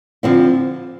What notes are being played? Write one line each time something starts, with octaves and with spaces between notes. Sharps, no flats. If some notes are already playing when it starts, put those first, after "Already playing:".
D3 F3 C4 E4